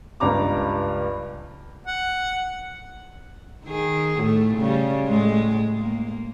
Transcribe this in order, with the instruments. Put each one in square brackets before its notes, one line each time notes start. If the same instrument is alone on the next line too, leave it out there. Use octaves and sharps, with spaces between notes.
[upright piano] C#2 G2 A#5 D6
[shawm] F#5
[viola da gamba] D#3 G#4
A2 A3
C#3 G3
A2 G#3
A#3